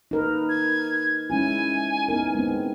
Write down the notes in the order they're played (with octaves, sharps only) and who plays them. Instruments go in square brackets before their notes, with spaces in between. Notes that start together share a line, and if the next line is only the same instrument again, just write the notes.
[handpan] D#4 A#4 B4
[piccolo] G#6
[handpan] G#3 C#4 E4 [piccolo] G#5
[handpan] B3 D#4 A#4
G#3 B3 C4